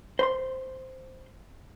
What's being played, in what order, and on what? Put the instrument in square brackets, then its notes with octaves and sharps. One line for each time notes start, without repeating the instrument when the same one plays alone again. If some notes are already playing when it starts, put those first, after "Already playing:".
[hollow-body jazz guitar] C5 B5 C6